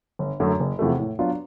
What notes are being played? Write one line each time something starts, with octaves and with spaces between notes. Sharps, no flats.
G1
F#2 D3 F#3 A3
F#1
E2 C3 F3 A3
A2
F#3 B3 D4 F4